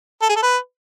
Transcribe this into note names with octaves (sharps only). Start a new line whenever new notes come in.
A4
G#4
A4
B4